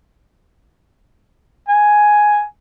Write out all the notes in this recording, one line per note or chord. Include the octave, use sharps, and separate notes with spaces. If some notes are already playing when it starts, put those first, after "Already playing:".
G#5